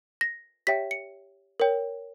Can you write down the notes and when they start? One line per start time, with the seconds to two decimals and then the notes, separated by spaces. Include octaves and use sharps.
0.21 A#6
0.67 G4 C#5 E5 G5 B6
0.91 C#7
1.60 A#4 C#5 G5